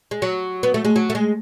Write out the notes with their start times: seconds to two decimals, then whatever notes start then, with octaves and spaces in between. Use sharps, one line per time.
0.11 G#3
0.22 F#3
0.63 B3
0.74 A3
0.85 G#3
0.96 F#3
1.10 A3
1.15 G#3